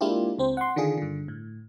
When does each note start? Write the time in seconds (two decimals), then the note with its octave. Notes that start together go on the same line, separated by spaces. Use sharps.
0.01 G#3 A#3 D4 E4 F4 G4
0.39 C#2 C4 C5
0.57 F#5 C6
0.76 D3 D#3 D4 F4 G#4
0.97 G2 D3
1.28 A2